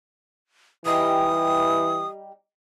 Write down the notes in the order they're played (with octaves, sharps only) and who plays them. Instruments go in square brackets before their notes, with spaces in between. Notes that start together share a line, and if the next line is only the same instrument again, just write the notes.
[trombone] E3 [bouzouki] G3 D#4 G4 [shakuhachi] D#6